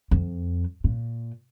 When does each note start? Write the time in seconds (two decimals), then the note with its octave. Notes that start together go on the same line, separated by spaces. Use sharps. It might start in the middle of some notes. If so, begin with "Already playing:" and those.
0.11 F2
0.84 A#2